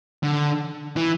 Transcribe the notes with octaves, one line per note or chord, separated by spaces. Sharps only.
D3
E3